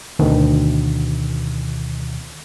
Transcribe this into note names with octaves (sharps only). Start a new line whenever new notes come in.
D2 B2 D#3